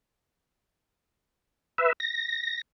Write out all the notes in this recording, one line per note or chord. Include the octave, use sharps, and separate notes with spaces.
B4 E5
A#6